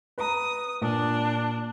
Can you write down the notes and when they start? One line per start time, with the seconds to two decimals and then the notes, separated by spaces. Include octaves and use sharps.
0.18 B4 A#5 D#6
0.81 A#2 D4